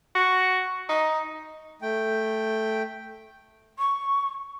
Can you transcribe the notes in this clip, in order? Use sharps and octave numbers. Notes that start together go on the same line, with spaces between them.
F#4
D#4
A3 G5
C#6